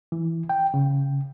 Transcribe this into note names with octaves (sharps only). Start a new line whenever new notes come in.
E3
G5
C#3